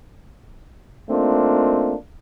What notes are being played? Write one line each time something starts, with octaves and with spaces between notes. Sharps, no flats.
A3 A#3 C4 D4 D#4 F4